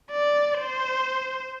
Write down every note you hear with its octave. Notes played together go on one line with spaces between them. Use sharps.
D5
C5